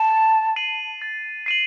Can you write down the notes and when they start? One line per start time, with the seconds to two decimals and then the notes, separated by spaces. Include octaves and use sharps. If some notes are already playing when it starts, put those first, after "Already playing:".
Already playing: A5
0.10 A6
0.56 C7 D#7 F#7
1.02 A6
1.46 C7 D#7 F#7